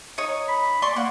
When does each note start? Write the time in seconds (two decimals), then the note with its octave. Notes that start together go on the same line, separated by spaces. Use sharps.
0.18 D#4 C#5 D#6
0.48 B5
0.82 D5 C6 C#6
0.96 A#3 F#5